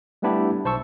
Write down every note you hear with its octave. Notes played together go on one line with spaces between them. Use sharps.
G3 A3 B3 D4 E4 G4
B1 C5 A5 C#6 E6